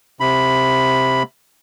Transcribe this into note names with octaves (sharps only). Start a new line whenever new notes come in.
C3 B5